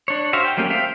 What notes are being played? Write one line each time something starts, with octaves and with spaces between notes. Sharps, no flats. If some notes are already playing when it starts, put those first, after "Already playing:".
D4 C#5
F#4 C5 E5 F5
G5
F#3 A3 A#3 C#4 G4
C5 E5 F5 G5